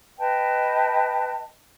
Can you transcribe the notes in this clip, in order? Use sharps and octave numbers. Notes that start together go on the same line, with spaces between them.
B4 D#5 G5 A5